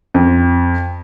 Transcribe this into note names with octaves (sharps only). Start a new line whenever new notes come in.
F2